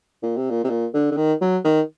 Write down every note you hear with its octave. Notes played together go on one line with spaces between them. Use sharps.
A#2
C3
A#2
C3
A#2
D3
D3
D#3
F#3
D#3